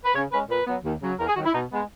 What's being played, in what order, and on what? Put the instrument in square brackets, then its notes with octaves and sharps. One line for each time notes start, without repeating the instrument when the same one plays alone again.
[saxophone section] B4
C#3 C#5
G#3 C#4 B4
A#2 B4
F#3 B3
D#2
C#3 F#3
E2 A#4
G#4
D#3 F#4
F#3 E4
B2 D#4
G#3 B3